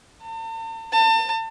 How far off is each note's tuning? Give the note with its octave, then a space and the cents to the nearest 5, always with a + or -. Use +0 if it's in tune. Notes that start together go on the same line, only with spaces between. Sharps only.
A5 +45
A5 +35